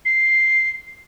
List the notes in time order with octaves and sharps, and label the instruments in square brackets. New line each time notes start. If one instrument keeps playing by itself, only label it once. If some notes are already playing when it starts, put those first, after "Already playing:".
[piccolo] C7